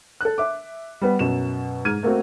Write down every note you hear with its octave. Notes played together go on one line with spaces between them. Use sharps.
A4 F#6
E5 D6
G3 B3 B4
F#2 B2 E7
G#2 F6 G#6 D#7
A3 A#3 C4 F#4